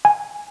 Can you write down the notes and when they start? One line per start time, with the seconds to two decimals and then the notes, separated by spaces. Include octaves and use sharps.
0.05 G#5